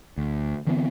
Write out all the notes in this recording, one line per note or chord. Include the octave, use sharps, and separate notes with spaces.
D2
D3 E3 B3 C4